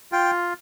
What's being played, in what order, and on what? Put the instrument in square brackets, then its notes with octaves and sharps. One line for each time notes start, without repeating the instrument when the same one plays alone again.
[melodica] F4 G5